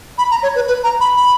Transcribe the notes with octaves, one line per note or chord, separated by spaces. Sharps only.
B5
A#5
C#5
B4
B4
A#5
B5
B5